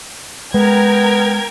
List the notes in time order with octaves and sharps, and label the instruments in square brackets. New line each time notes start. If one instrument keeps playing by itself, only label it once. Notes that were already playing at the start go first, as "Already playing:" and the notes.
[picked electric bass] G#3 [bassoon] B3 [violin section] A#4 G5 G#6